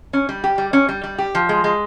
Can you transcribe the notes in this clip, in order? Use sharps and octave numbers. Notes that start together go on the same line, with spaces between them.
C#4
G3
G4
G3
C#4
G3
G3
G4
F3
G#3
G#3